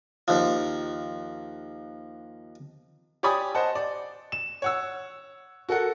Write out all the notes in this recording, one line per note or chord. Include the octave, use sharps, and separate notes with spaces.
D#2 F3
G4 C#5 D5 G#5 B5 D#6
C5 D#5 F#5 A5
D5
E7
C#5 F#5 E6
F#4 A4 A#4 F#5